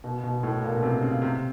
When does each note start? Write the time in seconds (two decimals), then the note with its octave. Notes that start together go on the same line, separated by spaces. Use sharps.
0.04 B2
0.24 B2
0.43 A2
0.63 A#2
0.75 B2
0.83 C3
1.02 C#3
1.22 C3